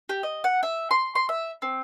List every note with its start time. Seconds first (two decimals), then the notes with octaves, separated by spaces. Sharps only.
0.09 G4
0.23 D#5
0.44 F#5
0.63 E5
0.91 C6
1.15 C6
1.29 E5
1.62 C4